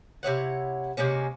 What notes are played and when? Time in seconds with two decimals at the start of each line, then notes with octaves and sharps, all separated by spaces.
0.23 C3 E4 C#5 F#5
0.97 C3 G#3 A#3 C#4